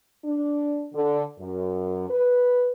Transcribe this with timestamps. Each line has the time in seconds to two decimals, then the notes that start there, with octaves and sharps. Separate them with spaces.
0.25 D4
0.93 D3
1.38 F#2
2.09 B4